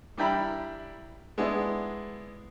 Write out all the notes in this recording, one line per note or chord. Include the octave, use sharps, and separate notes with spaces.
G3 D4 E4 G5 A#5 B5
G#3 B3 D4 E4